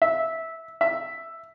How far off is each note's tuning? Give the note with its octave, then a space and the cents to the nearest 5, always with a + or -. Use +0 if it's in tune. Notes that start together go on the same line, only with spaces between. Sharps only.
E5 -15
E5 +0